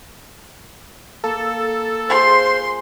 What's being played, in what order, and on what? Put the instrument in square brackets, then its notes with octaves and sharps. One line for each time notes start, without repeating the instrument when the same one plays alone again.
[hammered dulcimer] A#3 [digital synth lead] A4
[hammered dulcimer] F4 G#4 [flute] C5 [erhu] C6